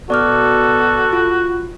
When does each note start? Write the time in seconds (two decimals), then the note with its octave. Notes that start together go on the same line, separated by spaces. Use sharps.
0.10 B2 F#4 A4 D5 D6 F6
1.13 F4